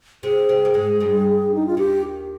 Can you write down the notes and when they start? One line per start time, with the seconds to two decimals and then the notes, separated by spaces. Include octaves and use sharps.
0.23 C3 C4 G#4
0.49 C3 C4
0.65 A#3
0.74 G#2 G#3
1.00 G2 G3
1.54 D#4
1.66 F4
1.77 D#2 D#3 G4